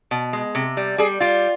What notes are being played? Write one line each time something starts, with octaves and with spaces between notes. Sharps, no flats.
B2
G#3
C3
G3
G3 G#4
G3 F4